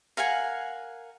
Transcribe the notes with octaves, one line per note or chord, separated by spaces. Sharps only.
A#4 F5 F#5 G#5